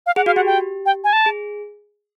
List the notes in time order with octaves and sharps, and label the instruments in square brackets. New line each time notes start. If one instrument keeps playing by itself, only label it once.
[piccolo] F5
[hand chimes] G#4 [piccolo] F#5
[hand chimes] F#4 [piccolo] F5
[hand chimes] G4 [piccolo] F#5
[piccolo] G5
G5
G#5
A5
[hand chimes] G#4